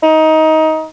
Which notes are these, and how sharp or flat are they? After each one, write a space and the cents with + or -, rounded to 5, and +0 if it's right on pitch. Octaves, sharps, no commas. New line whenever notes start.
D#4 +20